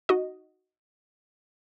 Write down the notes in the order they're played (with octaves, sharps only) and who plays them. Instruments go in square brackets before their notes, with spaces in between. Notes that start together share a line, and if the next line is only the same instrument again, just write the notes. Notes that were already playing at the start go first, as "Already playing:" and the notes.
[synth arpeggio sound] D#4 F#4 D#5